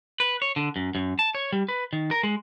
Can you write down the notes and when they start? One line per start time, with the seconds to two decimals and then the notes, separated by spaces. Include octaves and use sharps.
0.20 B4
0.42 C#5
0.56 D3
0.76 F#2
0.95 F#2
1.19 A5
1.35 C#5
1.53 G3
1.69 B4
1.93 D#3
2.11 A#4
2.23 G#3